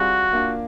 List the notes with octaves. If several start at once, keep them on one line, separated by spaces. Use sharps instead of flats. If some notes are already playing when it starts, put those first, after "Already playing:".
Already playing: G3 C4 F4 F#4 G#4
A#3 D4 F4